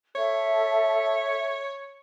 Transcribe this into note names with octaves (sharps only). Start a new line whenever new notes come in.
A4 C#5 E5